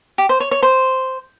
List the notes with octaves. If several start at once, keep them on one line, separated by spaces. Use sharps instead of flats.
G4
C5
C#5
C#5
C5